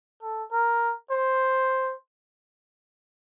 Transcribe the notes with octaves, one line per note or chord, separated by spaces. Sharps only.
A4
A#4
C5